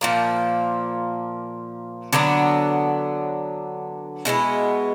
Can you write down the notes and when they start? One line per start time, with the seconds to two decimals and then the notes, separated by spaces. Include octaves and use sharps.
0.01 A#2 F3 A#3
2.13 D3 F#3 B3 D4
4.25 B2 G#3 B3 E4